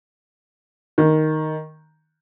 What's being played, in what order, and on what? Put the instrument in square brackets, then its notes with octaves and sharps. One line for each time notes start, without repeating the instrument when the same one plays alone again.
[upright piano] D#3